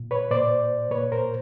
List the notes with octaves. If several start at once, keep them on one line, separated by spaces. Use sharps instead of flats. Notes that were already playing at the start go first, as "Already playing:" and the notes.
Already playing: A#2
B4 C#5
A#2 C5 D5
A#2 B4 C#5
A#4 C5